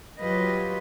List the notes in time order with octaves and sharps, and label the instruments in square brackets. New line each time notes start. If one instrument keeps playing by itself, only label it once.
[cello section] F#3 F4 G4 B4 D#5